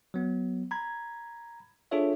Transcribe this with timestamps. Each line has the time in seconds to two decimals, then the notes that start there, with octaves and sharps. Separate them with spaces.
0.14 F#3 B3
0.71 A#5 B5 G#6
1.91 D4 F4 G#4 A4 C#5 E5